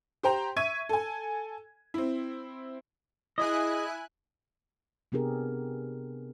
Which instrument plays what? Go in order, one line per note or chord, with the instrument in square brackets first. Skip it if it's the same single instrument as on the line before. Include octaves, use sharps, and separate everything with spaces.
[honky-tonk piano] G4 C5 G5 A#5
E5 C#6 G#6 D#7
A4 G#5
C4 E4
[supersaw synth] E4 G#5 F#6 [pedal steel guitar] G#4 D#5
[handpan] C3 B3 D4 G4 G#4 A#4